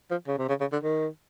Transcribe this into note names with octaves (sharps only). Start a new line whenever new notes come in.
F3
C#3
C3
C#3
C#3
D3
D#3